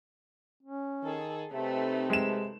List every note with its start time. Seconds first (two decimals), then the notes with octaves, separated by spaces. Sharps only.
0.63 C#4
1.04 D#3 G#4 A4
1.53 C3 A3 C4 D#4 B4
2.10 G#3 E7